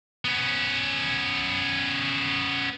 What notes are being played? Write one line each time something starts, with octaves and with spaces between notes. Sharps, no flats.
B3 C#4